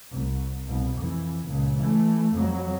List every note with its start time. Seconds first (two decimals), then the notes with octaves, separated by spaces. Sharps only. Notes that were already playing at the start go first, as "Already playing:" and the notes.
0.11 C2
0.66 C2 B2
0.97 F2 E3
1.47 C#2 A#2
1.77 E3 A3
2.34 F2 F#3